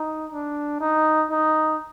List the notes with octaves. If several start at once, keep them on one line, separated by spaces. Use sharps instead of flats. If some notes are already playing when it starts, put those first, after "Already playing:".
Already playing: D#4
D4
D#4
D#4